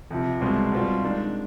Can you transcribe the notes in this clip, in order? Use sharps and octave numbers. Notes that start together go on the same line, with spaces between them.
F2 C3 F3
C2 B2 G#3 C4
B2 G3 C4 F4
D#3 G#3 D4